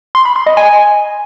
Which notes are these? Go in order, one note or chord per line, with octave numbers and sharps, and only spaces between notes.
C6
B5
C6
D#5
G#5